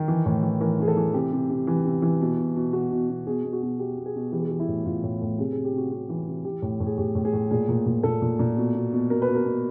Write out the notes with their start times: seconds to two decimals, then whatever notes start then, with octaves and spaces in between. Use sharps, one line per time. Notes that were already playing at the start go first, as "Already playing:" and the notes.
Already playing: D#3 A#4
0.08 E3
0.26 A2
0.43 E3
0.61 E3 A#4
0.79 E3 G#4
0.88 A4
0.97 E3
1.14 C3 G4
1.32 C3
1.50 C3
1.67 E3
1.85 C3
2.02 E3
2.21 B2
2.38 B2
2.56 B2
2.73 B2 F#4
2.91 B2
3.09 B2
3.27 B2 G#4
3.44 B2
3.53 F#4
3.62 B2
3.80 B2 G4
3.97 B2
4.06 G#4
4.15 B2
4.32 E3 G4
4.40 G#4
4.47 E3 G4
4.60 E4
4.68 A2
4.86 A2 F4
5.03 A2
5.21 A2
5.39 C3 G#4
5.52 C3 G#4
5.65 G4
5.74 C3 F#4
5.91 C3 F#4
6.09 E3
6.27 C3
6.44 E3 G4
6.62 A2
6.80 A2
6.86 G#4
6.98 A2 G4
7.15 A2
7.25 G#4
7.33 A2
7.51 A#2 G#4
7.69 A#2
7.86 A#2
8.03 A#2 A4
8.22 A#2
8.39 A#2
8.57 B2
8.74 B2
8.92 B2
9.10 B2 A#4
9.22 B4
9.28 B2
9.34 A#4
9.45 B2